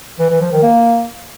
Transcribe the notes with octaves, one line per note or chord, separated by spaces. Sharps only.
E3
E3
F3
D#3
A#3